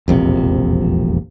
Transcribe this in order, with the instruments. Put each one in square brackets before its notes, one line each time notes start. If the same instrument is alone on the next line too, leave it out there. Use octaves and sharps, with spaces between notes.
[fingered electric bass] E1 A#1 F2 C3